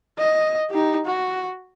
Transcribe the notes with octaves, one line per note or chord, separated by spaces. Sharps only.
D#5
D#4 G4
F#4